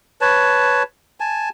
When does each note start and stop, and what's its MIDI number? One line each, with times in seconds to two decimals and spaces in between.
0.21 0.83 71
0.21 0.83 73
0.21 0.83 81
1.20 1.49 80
1.20 1.49 81